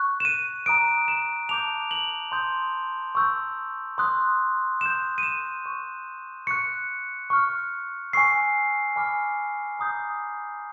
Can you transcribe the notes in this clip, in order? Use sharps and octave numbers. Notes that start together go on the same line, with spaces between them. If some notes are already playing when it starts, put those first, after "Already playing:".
Already playing: C#6 F#6
E7
D#7
A#5 D#6 F#6 D7
E7
A5 D6 G6 F7
F#7
C6 D#6 G6
C#6 E6 G6
C6 D#6 F#6
C6 D#6 G6 E7
D#7
E7
C#6 F#6
C#6 F#6 C#7
C#6 F6
G#5 C#6 E6 C7
G#5 B5 D6 F6
A#5 D#6 G6